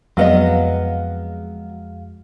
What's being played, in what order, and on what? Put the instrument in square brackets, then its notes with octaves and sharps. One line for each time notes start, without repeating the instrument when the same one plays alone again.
[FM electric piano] F2 G#3 F5 [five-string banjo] F#3 B3 D#5